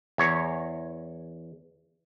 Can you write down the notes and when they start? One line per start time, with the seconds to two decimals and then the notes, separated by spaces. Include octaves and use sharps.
0.18 E2 C#5